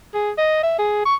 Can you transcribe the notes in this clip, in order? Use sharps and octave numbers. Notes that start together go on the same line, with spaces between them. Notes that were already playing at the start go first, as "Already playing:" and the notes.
G#4
D#5
E5
G#4
C#6